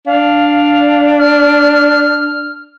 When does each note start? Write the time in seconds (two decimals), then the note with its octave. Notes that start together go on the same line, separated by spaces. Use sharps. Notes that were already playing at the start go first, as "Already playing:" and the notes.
0.06 D4 F5
1.19 F6